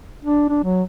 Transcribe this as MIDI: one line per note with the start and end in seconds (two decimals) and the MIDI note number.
0.25 0.44 62
0.49 0.61 62
0.64 0.83 54